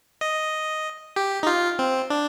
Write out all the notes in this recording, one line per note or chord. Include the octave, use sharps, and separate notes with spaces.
D#5
G4
D#4
F4
C4
D4